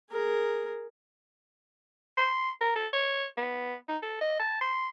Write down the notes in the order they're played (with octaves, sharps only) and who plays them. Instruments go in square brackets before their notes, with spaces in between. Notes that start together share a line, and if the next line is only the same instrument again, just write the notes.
[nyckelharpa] G#4 A#4
[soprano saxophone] C6
A#4
A4
C#5
B3
D#4
A4
D#5
A5
C6